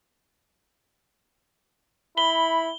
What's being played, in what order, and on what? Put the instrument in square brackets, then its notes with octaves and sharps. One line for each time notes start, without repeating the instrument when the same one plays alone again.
[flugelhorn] E4 [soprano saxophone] B5 [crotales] G7